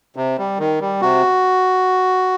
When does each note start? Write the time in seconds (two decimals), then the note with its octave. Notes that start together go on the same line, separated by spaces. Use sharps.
0.16 C3
0.38 G3
0.59 D#3
0.81 G3
1.02 C3 F#4